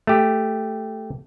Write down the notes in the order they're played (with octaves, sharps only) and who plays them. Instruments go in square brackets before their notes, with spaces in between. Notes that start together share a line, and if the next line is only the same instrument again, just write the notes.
[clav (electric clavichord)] A3 G4